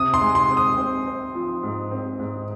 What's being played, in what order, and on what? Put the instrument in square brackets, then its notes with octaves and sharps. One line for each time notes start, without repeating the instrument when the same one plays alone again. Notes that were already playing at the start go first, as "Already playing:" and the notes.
Already playing: [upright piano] C3 [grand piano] D#6
[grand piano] C6
[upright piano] G#3
[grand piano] C6
[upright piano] C4
[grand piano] D#6
[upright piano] C4
C4
F3
G#2
C4
G#2